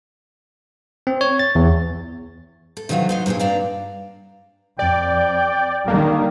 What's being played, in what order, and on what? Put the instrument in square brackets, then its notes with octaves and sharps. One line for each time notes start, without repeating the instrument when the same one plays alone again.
[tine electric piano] C4
C#5
A6
E2
[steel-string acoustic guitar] A4
C3 D#3 E3 F#3 F4 F#4
F#3 D#4 C5
G2 A#2 C4 G4 G#4
G2 D4 D5 F5 G5 A#5
[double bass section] F2 [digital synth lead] D5 [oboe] G5
[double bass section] D3 D#3 G3 [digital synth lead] A#3